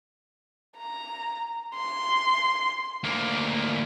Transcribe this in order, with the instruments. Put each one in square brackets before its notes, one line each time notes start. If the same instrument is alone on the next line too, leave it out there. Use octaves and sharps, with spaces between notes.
[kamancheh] A#5
C6
[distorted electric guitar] D2 A#3